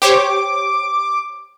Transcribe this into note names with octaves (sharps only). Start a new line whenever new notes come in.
G4 C5 C#5 D6